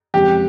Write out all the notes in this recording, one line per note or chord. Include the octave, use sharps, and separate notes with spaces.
F2 C#3 G#3 C4 G4